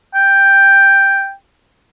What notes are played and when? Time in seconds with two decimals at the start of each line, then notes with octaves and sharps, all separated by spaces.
0.15 G5